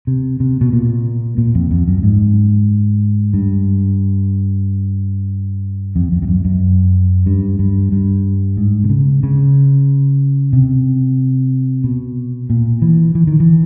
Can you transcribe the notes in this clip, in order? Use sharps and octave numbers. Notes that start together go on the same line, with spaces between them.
C3
C3
B2
A#2
A#2
F2
F2
F#2
G#2
G2
F2
F2
F2
F#2
F#2
G2
G2
G2
G#2
C3
C#3
C#3
C3
B2
A#2
E3
E3
D#3
E3